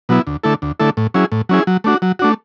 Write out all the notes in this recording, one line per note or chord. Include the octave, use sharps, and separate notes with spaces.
B2 F#3 B3 E4
D2
D3 A3 E4 A4
D2
D3 A3 E4 A4
A2
F#3 C#4 E4 G#4
A2
F#3 C#4 E4 G#4
F#3
A3 D4 F#4
F#3
A3 D4 F#4